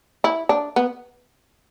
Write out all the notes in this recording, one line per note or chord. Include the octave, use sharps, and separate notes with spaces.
E4
D4
B3